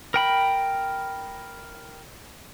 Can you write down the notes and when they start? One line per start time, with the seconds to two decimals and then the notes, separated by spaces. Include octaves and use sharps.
0.14 A#4 G5 B5